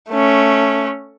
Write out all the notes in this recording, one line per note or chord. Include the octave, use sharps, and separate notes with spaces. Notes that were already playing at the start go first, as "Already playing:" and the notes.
A3 C#4